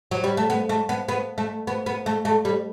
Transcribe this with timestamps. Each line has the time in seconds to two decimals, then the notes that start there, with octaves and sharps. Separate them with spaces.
0.11 F#3
0.24 G3
0.37 A3
0.50 B3
0.69 A3
0.89 B3
1.09 B3
1.38 A3
1.67 B3
1.86 B3
2.06 A3
2.25 A3
2.45 G3